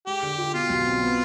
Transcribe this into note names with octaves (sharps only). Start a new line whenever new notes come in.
G#3 G4
D3
F4
B2 F4
B1
C4
B3